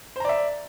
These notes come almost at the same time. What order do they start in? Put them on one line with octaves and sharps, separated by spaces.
C5 A#5 D5 E5